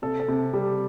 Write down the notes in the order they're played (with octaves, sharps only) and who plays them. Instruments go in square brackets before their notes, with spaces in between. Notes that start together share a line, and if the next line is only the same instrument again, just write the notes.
[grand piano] C3 A4
A4
C3
G3